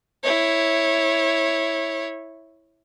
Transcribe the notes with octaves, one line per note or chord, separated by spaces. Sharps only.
E4 C#5